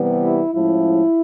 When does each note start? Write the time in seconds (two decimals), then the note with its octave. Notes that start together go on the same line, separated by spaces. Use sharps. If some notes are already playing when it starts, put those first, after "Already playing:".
Already playing: C3 E3 G3 B3
0.21 E4
0.52 A2 F3 G#3 C#4 E4